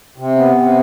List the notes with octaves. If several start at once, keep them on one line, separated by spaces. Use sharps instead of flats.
C3
B3
C3